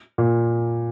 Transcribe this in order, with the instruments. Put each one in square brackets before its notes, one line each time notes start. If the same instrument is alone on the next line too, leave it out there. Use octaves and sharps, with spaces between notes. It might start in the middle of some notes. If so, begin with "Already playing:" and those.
[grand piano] A#2